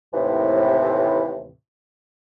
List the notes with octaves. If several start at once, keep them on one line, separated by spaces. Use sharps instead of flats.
D#2 A2 C3 E3